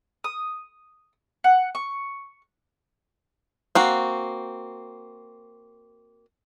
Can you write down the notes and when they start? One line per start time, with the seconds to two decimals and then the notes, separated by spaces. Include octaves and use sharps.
0.24 D#6
1.44 F#5
1.75 C#6
3.75 A#3 C4 F#4